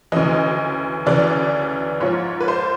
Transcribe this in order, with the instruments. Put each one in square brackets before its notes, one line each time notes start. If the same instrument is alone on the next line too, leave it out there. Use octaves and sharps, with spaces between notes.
[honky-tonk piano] D2 C#3 E3 D#5
D2 C#3 E3 D5
G#2 F3 C#5
B4
C5